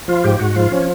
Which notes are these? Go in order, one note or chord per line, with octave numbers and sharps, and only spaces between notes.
F3 F4
G#2 G4
G#2 F#4
F3 F4
F3 C#4